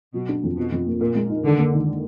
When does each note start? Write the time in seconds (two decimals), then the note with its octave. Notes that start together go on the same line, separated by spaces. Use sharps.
0.14 B2 F#3
0.29 D4
0.43 F2
0.57 B2 F3
0.72 F2
0.86 A#3
1.01 A#2 A#4
1.15 G#3
1.29 D#4
1.44 D3 D#3
1.58 A#3
1.73 D#3